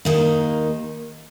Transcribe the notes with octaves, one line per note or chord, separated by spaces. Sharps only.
D#2 D#3 A#3